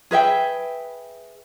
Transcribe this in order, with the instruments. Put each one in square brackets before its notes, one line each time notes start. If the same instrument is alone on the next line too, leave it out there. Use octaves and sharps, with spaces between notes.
[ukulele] G#4 B4 E5 G5